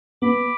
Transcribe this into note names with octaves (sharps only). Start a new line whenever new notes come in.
B3 B5 D6